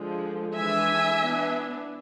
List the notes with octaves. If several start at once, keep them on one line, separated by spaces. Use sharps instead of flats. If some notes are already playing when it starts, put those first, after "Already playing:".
Already playing: D3 F3 G#3
E3 G#3 D4 E5 G#5
E3 B3 D4